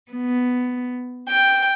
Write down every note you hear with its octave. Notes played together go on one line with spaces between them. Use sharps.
B3
G5